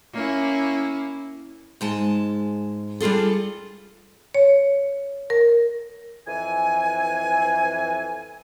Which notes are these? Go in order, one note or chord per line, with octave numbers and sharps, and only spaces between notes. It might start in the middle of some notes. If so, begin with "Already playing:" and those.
A#3 C#4 E4
G#2 G#3 A5
G3 D4 F4 G#4 A4
C#5
A#4
F2 E3 G#5